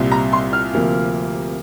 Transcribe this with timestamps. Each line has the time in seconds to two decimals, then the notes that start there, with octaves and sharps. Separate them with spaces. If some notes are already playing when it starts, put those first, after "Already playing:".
Already playing: C2 A#2 G3 C4
0.12 A#5
0.33 C6
0.53 F6
0.73 D2 C3 F3 A#3